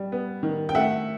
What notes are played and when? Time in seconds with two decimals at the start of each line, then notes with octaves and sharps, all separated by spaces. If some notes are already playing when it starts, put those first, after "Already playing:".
Already playing: G3
0.12 B3
0.43 D#3
0.69 G5
0.75 A3 E5 F#5